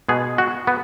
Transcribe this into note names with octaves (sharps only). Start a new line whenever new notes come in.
B2 G#3 B3 G#4
F#4
B3